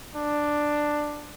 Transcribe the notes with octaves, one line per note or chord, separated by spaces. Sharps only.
D4